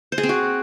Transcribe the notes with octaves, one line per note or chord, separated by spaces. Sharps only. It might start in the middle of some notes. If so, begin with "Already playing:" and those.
C5
G#4
C4
F#4